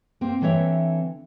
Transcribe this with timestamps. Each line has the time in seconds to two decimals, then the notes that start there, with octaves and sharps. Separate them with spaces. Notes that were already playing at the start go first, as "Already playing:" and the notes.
0.21 A#3 C4
0.41 D3 E3 C4 C#5 E5